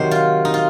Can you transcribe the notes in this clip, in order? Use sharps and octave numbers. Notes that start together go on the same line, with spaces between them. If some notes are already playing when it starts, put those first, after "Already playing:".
Already playing: C3 D#3 F#3 C5
F4
D#4
F4